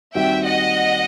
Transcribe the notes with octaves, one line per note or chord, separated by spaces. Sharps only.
D#2 D#3 G3 C4 F#4 E5 G5
D#5 F#5